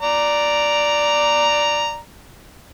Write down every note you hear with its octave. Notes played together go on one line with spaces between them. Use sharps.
D5 A#5